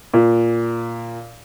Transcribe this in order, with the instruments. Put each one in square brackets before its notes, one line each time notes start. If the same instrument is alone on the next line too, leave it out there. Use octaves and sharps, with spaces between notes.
[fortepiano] A#2